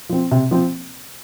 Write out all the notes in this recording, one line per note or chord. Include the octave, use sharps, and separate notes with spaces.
F3 C4
C3
F3 C4